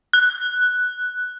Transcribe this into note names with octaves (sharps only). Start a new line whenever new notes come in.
F#6